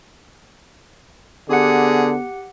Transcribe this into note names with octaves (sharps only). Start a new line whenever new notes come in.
D3 B3 G4 G#4 F#5